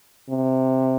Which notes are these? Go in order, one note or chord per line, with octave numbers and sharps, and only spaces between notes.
C3